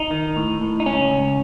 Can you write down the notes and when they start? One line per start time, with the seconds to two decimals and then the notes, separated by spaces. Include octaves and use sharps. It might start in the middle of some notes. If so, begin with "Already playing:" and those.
Already playing: D#4
0.11 D#3
0.36 A2
0.61 A2
0.80 D#4
0.86 C#2 C#4
1.11 C#2